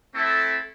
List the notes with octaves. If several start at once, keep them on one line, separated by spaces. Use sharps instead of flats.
A3 C4 E4 A4 E5